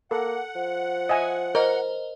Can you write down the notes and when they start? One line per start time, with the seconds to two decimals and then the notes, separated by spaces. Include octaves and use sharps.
0.11 A#3 A4 F#5
0.55 F3
1.09 D#5 E5 G#5
1.55 A#4 C5 D#5